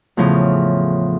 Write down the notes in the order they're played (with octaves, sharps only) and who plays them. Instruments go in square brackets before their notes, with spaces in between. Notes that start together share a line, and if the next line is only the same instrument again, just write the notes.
[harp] E2 A2 C#3 F3